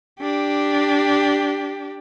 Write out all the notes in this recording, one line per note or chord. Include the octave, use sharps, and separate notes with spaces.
D4 G4